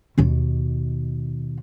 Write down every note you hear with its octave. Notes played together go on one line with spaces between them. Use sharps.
D#2 B2